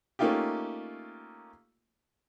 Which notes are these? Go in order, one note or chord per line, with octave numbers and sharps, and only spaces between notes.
A3 A#3 C#4 D#4 F4 G4